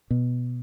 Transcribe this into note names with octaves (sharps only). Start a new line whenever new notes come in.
B2